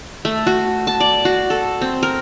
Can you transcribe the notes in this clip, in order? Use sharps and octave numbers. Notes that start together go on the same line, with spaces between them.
A3
F#4
A5
D5
F#4
A4
C4
A#4